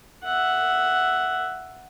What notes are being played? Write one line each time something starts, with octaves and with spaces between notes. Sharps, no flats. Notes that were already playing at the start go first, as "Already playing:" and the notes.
E5 F#5